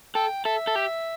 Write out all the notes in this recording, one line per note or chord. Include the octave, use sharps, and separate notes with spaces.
A4 G5
A4 E5
A4
G4